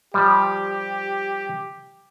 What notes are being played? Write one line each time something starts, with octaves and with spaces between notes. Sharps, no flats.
F3 G3 G4